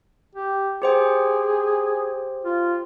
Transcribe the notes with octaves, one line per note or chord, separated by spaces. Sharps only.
G4
G4 G#4 C5 G5
F4